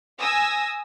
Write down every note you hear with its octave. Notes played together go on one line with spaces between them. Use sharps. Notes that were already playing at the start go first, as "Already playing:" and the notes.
G#5 D#6 E6 A#6